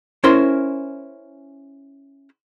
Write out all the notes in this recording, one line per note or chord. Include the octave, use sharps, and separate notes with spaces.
C#4 E4 A#4 C5 C6